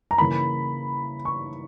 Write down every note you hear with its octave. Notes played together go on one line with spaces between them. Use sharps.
A#5
C#3 E3 A#3 B5
C#6